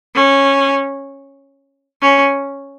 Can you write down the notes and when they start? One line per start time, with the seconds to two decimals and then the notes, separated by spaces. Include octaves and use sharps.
0.15 C#4
2.02 C#4